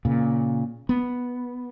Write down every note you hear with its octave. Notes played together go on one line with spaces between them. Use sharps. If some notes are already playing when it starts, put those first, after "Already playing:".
A#2 C#3
B3